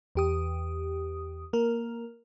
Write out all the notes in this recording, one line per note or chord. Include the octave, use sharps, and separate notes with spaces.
E2 G4 D#6
A#3 A#4